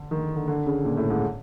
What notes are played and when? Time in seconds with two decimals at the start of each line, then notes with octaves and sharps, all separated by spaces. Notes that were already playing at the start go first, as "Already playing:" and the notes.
Already playing: D3
0.11 D#3
0.35 D3
0.48 D3
0.66 C#3
0.85 A#2
0.97 A2
1.09 G#2